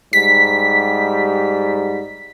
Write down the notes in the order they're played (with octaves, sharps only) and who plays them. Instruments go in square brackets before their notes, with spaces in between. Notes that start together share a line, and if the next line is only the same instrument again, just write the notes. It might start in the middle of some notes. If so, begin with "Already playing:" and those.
[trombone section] G#2 G3 [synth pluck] B6